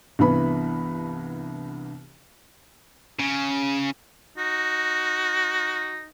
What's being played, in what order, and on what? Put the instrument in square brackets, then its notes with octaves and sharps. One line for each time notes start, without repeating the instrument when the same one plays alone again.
[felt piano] C2 G2 E3 B3 B5
[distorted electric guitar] C#3
[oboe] D#4 [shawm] F#4